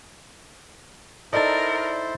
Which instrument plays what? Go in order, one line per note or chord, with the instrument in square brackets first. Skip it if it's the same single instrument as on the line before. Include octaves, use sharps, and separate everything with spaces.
[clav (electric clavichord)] D#4 A4 D#5 [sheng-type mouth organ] E4 C5 [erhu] A#4 [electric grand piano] D5 A6